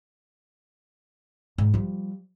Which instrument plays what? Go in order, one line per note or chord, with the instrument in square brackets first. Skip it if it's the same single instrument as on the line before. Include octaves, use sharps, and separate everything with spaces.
[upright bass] G#2
F3 G3